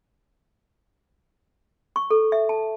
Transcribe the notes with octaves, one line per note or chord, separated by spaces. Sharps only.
C#6
A4
E5
A5